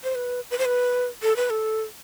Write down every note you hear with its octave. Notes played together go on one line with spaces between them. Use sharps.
C5
B4
B4
C5
B4
A4
B4
A4